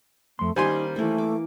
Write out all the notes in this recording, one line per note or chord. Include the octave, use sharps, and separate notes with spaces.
F2 A3 C6
D#3 G3 A#3 C#4 D#4 C5 G#5 C6
E3 A3 A#3
D6